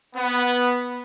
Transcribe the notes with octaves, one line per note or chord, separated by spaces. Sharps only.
B3